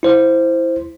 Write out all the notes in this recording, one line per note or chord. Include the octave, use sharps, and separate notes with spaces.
E4 C5